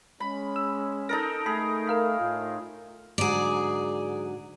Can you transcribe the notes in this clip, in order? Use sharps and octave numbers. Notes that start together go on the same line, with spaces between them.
G#3 C#4 B5
E6
D#4 A4 A#4 A#6
A3 G#4 B5
A#4 F5 B5
A2 F4
G#2 D3 F#3 G#4 D5